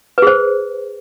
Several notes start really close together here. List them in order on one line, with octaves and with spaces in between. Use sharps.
B4 G#4 C5